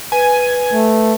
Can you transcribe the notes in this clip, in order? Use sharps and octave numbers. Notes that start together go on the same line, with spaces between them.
B4 G#5
A3